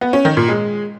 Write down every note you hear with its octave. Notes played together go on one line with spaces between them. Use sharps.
B3
C#4
D#3
A#2
G#3